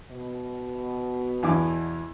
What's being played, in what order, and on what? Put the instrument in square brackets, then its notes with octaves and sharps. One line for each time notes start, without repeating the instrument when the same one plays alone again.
[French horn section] B2
[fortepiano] E2 E3 D6